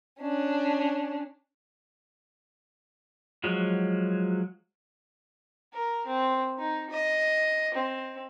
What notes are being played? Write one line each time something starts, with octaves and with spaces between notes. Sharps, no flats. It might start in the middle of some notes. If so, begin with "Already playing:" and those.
C#4 D4
F3 F#3 G#3 F#4
A#4
C4
D#4
D#5
C4